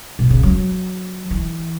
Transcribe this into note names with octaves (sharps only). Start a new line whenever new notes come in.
B2
C#3
F#3
E3